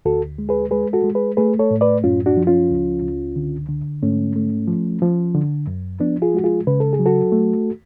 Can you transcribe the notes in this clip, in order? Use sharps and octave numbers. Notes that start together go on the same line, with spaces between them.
D2 F#4 A4
G#3
G#4 B4
G#3 G#4 B4
F#4 A4
G#3
G#4 B4
A3 G#4 B4
A4 C#5
A2
B4 D5
F#2 C#4 F4
D4 F#4
F3
C#4 F4
C#2
C#2
D3
D3
G#2 A3 C#4
A3
F3
F3
D3
F#2
F3 B3 D4
F4 G#4
G#3 F#4
F4 G#4
C#3 B4
A4
G#4
F#3
F#4 A4
A3